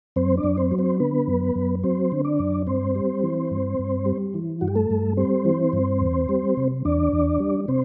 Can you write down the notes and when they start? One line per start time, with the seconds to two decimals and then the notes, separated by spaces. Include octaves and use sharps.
0.16 F#2 C4 C5
0.37 D4 D5
0.44 F#2
0.57 C4 C5
0.71 F#3
0.78 C4 C5
1.00 D3 B3 B4
1.28 F#2
1.55 F#2
1.83 F#3 C4 C5
2.12 D3
2.25 D4 D5
2.39 F#2
2.67 G2 C4 C5
2.95 G3
3.23 E3
3.51 G2
3.79 G2
4.06 G3
4.34 E3
4.61 G2 F#4
4.68 G4
4.75 A3 A4
4.90 G2
5.17 G3 C4 C5
5.45 E3
5.73 G2
6.01 E2
6.29 G3
6.57 C3
6.85 E2 D4 D5
7.13 E2
7.40 G3
7.68 C3 C4 C5